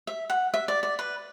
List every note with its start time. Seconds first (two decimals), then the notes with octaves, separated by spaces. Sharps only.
0.07 E5
0.30 F#5
0.54 E5
0.68 D5
0.83 D5
0.99 B4